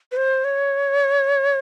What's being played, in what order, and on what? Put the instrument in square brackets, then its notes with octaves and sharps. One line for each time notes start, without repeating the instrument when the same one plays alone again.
[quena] B4
C5
C#5